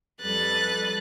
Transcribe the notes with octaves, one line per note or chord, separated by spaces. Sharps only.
F2 G3 A4 B4 F#6 A6